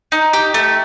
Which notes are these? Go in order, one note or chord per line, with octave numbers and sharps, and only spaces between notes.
D#4
G4
A3